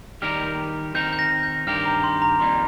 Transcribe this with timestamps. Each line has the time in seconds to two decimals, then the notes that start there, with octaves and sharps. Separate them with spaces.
0.22 D#3 G3 D#4 G4 A#4 F6
0.95 D#3 C4 D#4 A#4 G6
1.13 G6
1.19 A#6
1.43 G6
1.67 G2 D#3 C4 G4 A#4 F6
1.86 A#5
2.04 C6
2.22 A#5
2.40 F2 D#3 G3 A#3 C6